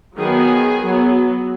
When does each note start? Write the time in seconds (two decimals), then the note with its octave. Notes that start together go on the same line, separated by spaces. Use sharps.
0.18 D#3 F#3 B3 G#4
0.82 F#3 B3